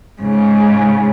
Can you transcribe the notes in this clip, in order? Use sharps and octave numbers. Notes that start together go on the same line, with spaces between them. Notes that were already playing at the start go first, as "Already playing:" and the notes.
G#2 C#3